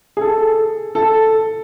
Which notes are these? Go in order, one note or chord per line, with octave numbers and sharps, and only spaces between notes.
G#4
A4
A4